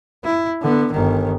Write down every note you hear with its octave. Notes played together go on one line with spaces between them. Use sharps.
E4
D3 B3
G1 D#3